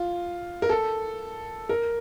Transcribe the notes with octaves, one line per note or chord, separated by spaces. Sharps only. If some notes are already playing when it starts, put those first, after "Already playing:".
Already playing: F4
A#4
A4
A#4